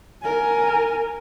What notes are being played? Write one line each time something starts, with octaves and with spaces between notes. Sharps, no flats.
A#4 G#5